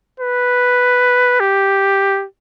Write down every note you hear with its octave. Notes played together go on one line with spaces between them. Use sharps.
B4
G4